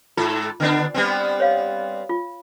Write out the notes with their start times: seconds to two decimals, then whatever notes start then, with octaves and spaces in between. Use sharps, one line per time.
0.17 G#2 F4 A4
0.60 D3 B3 D4
0.94 G3 B3 C4
1.40 C#5 F5
2.09 F4